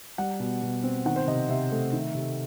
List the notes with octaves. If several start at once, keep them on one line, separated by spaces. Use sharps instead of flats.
G3 F#5
B2
B2
C4
D#3 F#5
C5
C3 D#5
C3 E5
A3
D#3
C3